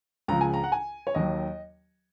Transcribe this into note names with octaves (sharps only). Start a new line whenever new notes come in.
C#2 C#3 F3 A#5
G#5
A#5
F#5
G#5
C#5
D#2 D#3 F#3 D#5